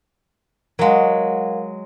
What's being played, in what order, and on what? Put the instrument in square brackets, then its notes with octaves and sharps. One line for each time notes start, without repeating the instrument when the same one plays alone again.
[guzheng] F#3 G#3 [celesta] A#4 F5 F#5